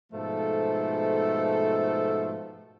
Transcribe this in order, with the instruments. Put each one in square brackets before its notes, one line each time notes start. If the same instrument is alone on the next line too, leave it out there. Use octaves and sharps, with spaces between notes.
[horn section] G#2 B2 F3 A3 A4